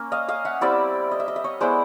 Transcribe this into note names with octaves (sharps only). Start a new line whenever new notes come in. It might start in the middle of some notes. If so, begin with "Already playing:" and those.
Already playing: A#3 C#4
D#5 F5
D#5 F5
E5 F#5
G3 C4 E4 D5 E5
D#5
E5
D#5
E5
C#5 D#5
G#3 B3 E4 C5 D5